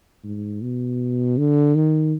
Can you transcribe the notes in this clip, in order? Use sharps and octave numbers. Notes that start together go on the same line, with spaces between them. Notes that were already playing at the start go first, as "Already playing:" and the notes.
G#2
B2
D3
D#3